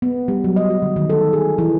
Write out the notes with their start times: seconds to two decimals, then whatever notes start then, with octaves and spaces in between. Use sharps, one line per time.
0.02 B3
0.28 G3
0.44 F#3
0.56 D#5
0.70 F#4
0.82 D3
0.96 D#3
1.09 A4
1.33 G#4
1.58 E3